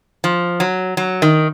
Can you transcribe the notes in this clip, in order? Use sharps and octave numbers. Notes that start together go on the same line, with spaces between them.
F3
F#3
F#3
D#3